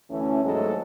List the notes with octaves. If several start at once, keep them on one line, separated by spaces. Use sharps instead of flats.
D2 E3 A3 C#4
D#2 G#2 F#3 G#3 A3 A4